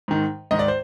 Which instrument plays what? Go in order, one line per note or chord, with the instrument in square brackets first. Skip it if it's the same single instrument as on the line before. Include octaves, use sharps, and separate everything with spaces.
[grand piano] G#2 D#3
G#2 D#3 D#5
D5
C5